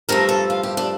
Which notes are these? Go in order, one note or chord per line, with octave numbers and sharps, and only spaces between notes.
G2 F3 A3 A#4
A4
F4
G4
D4